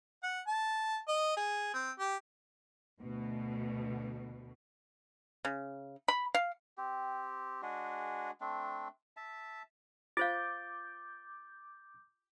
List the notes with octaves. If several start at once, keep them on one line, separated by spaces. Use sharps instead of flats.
F#5
A5
D#5
G#4
C4
G4
D2 B2
C#3
B5
F5
C4 G4
G#3 D4 F#4 G#4
A3 C4 D4
E5 A5
F4 C5 F5 D6 G6 A6